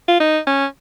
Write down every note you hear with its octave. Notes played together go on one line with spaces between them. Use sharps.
F4
D#4
C#4